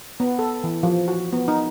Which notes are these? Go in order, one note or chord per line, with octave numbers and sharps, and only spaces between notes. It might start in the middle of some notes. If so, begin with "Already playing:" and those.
B3
A4
E3
F3
F#4
B3
D#4